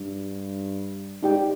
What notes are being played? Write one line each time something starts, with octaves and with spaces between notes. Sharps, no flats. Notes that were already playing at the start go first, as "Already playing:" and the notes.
Already playing: G2
G#2 D#4 G4 D5 G5